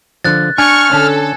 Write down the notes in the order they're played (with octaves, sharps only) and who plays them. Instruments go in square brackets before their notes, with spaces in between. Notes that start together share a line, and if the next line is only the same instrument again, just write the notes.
[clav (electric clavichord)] D3 F3 [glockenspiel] F#6 A6
[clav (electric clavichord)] D4 [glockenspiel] G#5 G#6 [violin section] C#6 [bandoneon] F6
[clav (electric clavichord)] D3 C#4 [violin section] A4